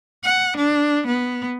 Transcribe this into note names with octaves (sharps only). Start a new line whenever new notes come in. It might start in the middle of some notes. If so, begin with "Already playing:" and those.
F#5
D4
B3